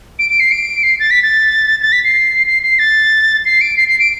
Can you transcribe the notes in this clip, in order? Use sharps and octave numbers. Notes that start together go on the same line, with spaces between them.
D7
D7
C7
D7
C7
A6
B6
A6
A6
B6
C7
C7
C7
A6
C7
D7
C7
C7
D7